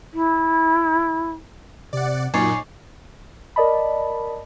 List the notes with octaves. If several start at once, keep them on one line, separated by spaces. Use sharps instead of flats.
E4
C3 D5 F#5
F#2 A#2 D#4 C#5 D5 G#5 C7
A#4 D5 D#5 A5 B5